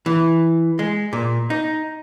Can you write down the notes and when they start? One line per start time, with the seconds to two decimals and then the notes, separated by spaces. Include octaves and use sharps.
0.06 E3
0.79 G#3
1.13 A#2
1.50 D#4